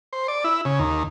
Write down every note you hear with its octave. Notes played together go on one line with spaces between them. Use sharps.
C5
D5
E4
C#3
D#2